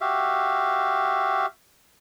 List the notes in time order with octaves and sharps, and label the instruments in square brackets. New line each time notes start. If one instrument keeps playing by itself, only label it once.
[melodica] F#4 G4 E5 F5